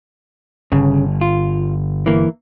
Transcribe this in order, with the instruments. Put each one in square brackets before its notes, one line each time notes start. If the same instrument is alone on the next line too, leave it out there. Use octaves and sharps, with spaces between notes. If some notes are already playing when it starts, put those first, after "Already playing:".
[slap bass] G1 [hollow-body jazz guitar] C#3
[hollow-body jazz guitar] F4
E3 A#3